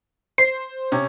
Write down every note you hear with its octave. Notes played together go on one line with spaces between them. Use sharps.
C5 C7
C3 C#4